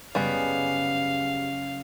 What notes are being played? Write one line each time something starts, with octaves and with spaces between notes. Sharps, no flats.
F#1 G3 G#3 B3 C#4 F5